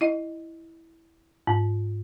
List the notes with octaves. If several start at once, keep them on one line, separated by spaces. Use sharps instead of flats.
E4 D#5
G#2